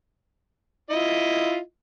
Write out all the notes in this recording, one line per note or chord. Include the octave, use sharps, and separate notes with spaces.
E4 F4 D#5